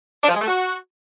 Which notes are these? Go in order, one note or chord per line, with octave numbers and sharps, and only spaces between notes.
D4
F3
G#3
A3
F#4